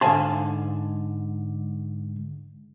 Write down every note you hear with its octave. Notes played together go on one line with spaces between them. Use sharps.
G#2 D3 F5 G#5 A5 C6